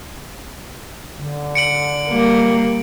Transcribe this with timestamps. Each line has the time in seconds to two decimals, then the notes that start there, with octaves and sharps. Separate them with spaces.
1.18 D3
1.55 C#7 D7 F#7
2.09 G3 A#3